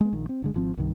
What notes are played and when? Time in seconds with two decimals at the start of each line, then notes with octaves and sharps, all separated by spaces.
0.01 G#3 B3
0.13 A#1 D#3
0.29 C4
0.42 F#1 D3 G#3
0.54 G#1 F3 C4
0.77 C2 G2 D#3